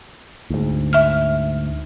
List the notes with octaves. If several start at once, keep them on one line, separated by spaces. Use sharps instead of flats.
D2 G#2
E5 F6